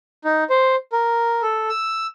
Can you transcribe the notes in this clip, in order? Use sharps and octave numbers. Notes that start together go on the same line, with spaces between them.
D#4
C5
A#4
A4
E6